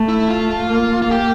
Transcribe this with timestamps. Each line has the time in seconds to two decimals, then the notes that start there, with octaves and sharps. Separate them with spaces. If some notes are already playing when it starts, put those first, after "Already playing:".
Already playing: A3
0.09 E4
0.28 F4
0.70 A#3
1.02 F4
1.10 G4